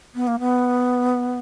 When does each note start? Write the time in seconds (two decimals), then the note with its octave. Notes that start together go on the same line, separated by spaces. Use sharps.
0.15 B3
0.27 A#3
0.39 B3